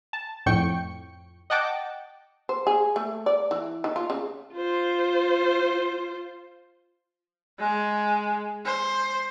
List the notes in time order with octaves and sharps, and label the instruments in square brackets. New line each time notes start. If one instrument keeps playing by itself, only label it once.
[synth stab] A5
F2 A2 G5 C#6 C#7
D#5 F#5 G5 A5 D6
[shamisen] C5
G#4
A3
D5
E3
D#3
F4
C#3
[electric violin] F4 C5
[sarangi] G#3
C5